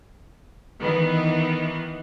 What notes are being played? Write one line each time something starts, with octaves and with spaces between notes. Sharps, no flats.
D#3 E3 B3